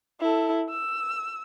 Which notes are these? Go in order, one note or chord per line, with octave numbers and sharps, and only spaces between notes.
E4 A4
E6